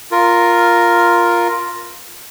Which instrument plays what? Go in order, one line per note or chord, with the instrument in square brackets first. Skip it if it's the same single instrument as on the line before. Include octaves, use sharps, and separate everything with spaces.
[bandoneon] F4 A#4